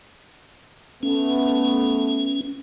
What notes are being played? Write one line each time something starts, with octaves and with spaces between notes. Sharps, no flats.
A3 B3 C#4